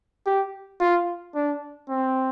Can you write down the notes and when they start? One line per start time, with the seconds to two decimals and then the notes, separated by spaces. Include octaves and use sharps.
0.26 G4
0.80 F4
1.35 D4
1.89 C4